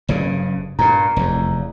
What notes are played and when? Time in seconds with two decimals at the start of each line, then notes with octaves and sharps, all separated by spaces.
0.09 F#1 G2 C#3
0.79 G2 A#2 A#5
1.16 F1 E2